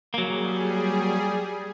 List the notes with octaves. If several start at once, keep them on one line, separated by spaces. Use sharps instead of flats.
F#3 G3 A#3 G#4